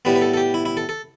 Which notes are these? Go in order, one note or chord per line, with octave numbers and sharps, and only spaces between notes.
A2 G3 B3 B4
B4
A4
A4
G4
E4
E4
A4
A4